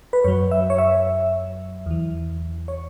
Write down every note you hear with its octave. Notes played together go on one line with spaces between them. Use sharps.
B4
F#2 F#3 C#5
E5
C#5
E5
E2 E3
C#5